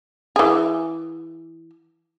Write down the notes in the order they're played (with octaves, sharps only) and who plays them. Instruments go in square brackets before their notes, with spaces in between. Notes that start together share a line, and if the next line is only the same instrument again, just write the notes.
[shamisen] E3 G#4